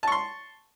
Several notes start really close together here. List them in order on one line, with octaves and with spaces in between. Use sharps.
A5 C#6 C6